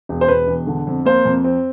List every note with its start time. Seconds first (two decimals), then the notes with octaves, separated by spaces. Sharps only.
0.09 E1
0.21 C5
0.28 E1 B4
0.47 E1
0.67 D3
0.87 F2
1.05 A#3 C5
1.25 F2
1.44 C4